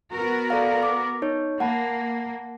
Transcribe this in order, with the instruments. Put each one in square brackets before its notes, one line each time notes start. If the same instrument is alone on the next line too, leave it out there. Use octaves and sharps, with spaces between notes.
[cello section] B3 F#4 A#4
[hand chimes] A4 D5 F5
D6
D#4 C#5
[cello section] A#3 [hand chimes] F#5 A5 B5